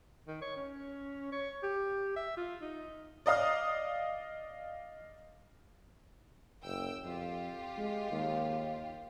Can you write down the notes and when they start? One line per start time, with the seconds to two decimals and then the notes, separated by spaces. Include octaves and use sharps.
0.27 D#3
0.42 C#5
0.56 C#4
1.32 C#5
1.63 G4
2.16 E5
2.37 F4
2.61 D#4
3.26 D5 D#5 F5 D#6 F6
6.65 F#1 G5 E6
7.04 F2 F4 G4
7.78 G#3
8.12 D#2